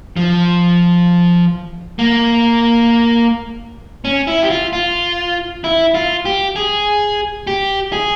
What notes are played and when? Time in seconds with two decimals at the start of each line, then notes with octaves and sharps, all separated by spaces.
0.17 F3
1.99 A#3
4.05 C#4
4.27 E4
4.43 G4
4.50 F4
4.73 F4
5.64 E4
5.94 F4
6.25 G4
6.56 G#4
7.47 G4
7.93 G#4